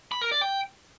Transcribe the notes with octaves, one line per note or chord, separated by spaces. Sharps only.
B5
A#4
D5
G5